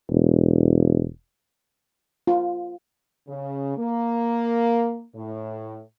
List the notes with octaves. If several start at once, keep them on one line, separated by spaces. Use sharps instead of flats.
E1
F4
C#3
A#3
A2